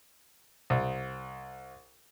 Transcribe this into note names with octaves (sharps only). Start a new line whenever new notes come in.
C2